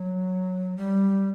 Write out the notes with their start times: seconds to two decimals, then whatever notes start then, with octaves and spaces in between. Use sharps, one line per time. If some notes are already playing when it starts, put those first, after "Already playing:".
Already playing: F#3
0.77 G3